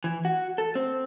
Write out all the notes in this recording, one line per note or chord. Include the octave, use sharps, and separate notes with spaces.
E3
F#4
A4
C4